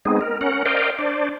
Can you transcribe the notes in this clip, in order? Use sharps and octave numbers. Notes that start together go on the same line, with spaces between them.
G#3 B3 C4 D#4 G#4
A#4
C#4 A#4 F#5
A#4 C5 D5 D#5 F5 G5
D4 C5 D5